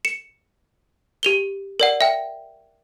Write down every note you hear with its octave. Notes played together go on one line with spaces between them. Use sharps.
C#7 E7
G4 F7 G7
A#4 D5 F#5
E5 G5